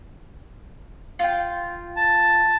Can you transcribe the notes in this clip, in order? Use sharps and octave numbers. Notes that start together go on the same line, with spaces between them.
F4 G5
A5